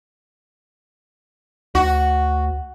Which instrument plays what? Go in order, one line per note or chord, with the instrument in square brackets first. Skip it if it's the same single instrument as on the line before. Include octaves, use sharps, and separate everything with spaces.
[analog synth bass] D2 [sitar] F#4